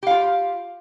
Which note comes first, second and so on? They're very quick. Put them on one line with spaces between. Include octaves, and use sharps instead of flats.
G4 F5 F4